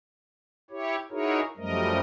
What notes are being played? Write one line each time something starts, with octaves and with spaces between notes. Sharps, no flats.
E4 G4 C#5
D#4 E4 F#4 G#4 A#4 C#5
F#2 F3 G3 A3 A#4 D#5